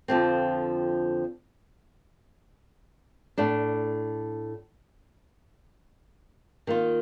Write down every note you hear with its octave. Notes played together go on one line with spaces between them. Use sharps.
F2 D3 F3 C4
A2 A3 D4
D#3 A#3 F4